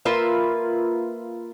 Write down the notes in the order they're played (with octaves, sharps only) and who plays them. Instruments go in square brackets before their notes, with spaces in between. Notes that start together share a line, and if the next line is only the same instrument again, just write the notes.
[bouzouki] A#3 F4 B4 E5